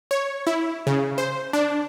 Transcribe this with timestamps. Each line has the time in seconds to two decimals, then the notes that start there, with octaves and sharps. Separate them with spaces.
0.11 C#5
0.47 E4
0.87 C#3
1.18 C5
1.53 D4